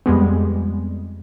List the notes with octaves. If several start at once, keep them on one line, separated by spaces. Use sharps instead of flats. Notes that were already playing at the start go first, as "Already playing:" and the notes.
F2 G3 G#3 B3